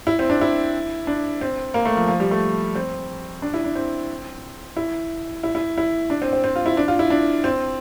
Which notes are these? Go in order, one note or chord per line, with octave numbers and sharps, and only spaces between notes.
E4
C4
D4
E4
D4
C4
A#3
A3
F3
F3
G3
A3
C4
D4
E4
D4
C4
E4
E4
E4
E4
D4
C4
C4
C4
F4
E4
D4
F4
E4
D4
C4